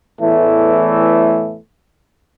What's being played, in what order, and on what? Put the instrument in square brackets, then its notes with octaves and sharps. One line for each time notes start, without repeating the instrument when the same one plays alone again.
[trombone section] E2 A2 E3 A3